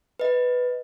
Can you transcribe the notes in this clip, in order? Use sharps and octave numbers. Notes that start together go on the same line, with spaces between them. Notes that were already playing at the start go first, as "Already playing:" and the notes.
B4 D#5